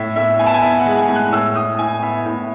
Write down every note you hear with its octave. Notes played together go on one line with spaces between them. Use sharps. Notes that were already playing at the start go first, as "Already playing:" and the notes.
Already playing: A2 E5
A2 E5
B3 G#5
A5
G#5
B3 E5
F#5
G#3
G#5
A2
F#6
A2 E6
A2 D#6
A2 G#5
B3 E5
A2